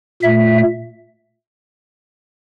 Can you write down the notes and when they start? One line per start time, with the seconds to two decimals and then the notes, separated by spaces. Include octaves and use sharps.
0.23 A#2 A3 E5